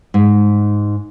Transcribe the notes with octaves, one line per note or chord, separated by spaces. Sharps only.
G#2